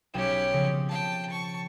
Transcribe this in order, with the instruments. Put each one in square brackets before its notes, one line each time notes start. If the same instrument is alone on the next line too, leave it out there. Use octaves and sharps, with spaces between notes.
[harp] B1 G5 E7 [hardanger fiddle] C#4 G4
[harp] C#3 F3 C4
[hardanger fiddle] G5 A5
A5 C#6